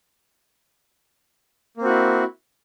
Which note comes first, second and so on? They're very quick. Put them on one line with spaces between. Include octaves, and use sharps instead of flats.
A#3 C4 F#4 E4